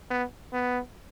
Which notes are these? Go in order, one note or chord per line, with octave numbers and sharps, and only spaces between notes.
B3
B3